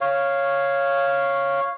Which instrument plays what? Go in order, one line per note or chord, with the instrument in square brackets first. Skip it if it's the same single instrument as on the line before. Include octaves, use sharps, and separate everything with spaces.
[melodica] C#5 F5